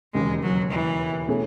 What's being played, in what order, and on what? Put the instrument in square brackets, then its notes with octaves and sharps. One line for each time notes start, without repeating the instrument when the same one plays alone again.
[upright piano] E1 D#2 C#3 [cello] G#3
[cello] F#3
E3
[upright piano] B2 A3 C#4 G#4